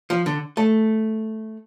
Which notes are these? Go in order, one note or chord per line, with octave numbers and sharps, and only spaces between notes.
F3
D3
A3